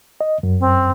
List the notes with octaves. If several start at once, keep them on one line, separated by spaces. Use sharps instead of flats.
D#5
F#2
C4